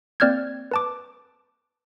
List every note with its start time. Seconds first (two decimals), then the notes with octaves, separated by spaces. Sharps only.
0.20 A#3 C4 D5 F6 G6 G#6
0.71 B4 A5 D6